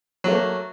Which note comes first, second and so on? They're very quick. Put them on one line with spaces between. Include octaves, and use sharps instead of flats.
F#3 A3 A#3